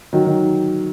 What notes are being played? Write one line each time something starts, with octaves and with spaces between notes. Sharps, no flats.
D#3 F#3
D#3